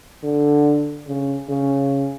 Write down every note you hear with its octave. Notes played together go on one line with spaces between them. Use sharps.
D3
C#3
C#3